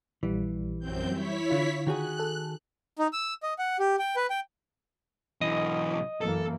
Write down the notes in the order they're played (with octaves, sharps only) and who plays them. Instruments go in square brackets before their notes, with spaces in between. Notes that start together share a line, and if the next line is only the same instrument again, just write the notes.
[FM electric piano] A#1 G3 [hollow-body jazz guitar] E3
[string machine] F#2 C4 G6
[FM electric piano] G3 [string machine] E4 C#5 B6
[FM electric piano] D3 F4
[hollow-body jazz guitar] D#3 F#4 G#4 [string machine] F#6
[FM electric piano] A4
[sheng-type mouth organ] D#4
E6
D#5
F#5
G4
G5
B4
G5
[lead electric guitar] B1 E3 [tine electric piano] D#5 D#6
[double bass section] F#2 E3 A#3 [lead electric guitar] A4